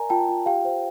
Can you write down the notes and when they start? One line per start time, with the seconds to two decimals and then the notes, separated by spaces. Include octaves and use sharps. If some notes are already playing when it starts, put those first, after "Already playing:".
Already playing: A#4 D5 G#5 A#5
0.10 F4 G5 A5
0.29 F4
0.46 G4 F5 G5
0.65 C5